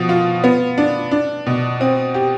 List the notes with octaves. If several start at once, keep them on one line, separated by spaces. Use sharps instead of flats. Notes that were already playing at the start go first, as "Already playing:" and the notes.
Already playing: B2 F3
F4
B3
D4
D4
B2
C4
G4